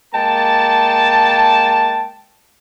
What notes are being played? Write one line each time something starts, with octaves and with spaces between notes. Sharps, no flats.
G#3 A#3 G5 A5